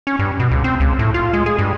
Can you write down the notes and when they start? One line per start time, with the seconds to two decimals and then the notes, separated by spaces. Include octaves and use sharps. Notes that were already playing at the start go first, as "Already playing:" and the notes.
0.07 C#4
0.19 G2
0.40 B2
0.51 C#2
0.64 C4
0.80 C#2
0.99 A2
1.14 F4
1.33 G#3
1.46 G#4
1.58 G2